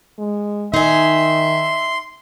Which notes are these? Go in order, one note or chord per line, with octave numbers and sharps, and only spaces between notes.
G#3
D#3 D#4 E5 G#5 C6